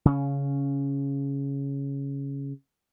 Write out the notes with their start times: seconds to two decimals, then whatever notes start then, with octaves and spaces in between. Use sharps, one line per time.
0.05 C#3 C#4